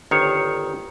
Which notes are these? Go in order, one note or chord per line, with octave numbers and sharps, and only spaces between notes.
G1 D#3 C5 C#5